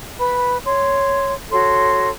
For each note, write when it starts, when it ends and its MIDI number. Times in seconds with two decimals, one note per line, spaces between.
0.19 0.58 71
0.19 0.58 83
0.65 1.34 73
0.65 1.34 84
1.51 2.10 66
1.51 2.10 69
1.51 2.10 73
1.51 2.10 84